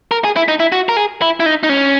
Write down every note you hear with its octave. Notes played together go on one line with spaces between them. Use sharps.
A#4
G#4
E4
D#4
E4
F#4
A#4
G#4
E4
E4
D#4
D#4
C#4